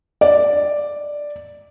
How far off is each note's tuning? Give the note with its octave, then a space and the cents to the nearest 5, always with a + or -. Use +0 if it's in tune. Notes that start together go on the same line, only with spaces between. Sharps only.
D5 +0